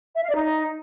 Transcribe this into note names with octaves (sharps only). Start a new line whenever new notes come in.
E5
F5
D5
D#4